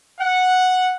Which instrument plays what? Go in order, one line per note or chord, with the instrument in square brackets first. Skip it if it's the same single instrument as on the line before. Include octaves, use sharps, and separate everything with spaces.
[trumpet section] F#5